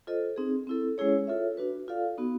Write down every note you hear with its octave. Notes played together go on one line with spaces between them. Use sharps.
F4 A4 C5 D#5
C4 D#4 G#4
C4 E4 A4
G#3 C#4 E4 G#4 C#5
F4 A4 C#5 E5
D4 F#4 B4
F4 A4 D5 F5
B3 D#4 F#4